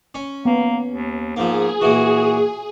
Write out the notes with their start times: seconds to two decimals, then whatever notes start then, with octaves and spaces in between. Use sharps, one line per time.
0.15 C#4
0.45 A#3 B3
0.88 D#2
1.36 G#2 F3 A#3 G#4
1.81 A#2 E3 F#4